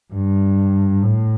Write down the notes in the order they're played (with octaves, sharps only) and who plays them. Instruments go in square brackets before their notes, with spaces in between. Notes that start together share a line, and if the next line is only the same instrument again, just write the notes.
[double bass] G2
A2